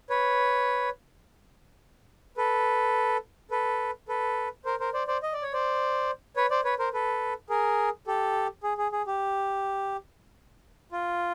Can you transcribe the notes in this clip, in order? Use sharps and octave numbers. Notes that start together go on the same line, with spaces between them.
B4 C#5
A4 B4
A4 B4
A4 B4
A#4 C5
A#4 C5
C5 D5
C5 D5
D#5
D5
C#5
C5 D5
B4 C#5
C5 D5
B4 C#5
A#4 C5
A4 B4
G#4 A#4
G4 A4
G#4
G#4
G#4
G4
F4